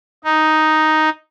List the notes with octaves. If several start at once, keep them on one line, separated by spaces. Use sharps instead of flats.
D#4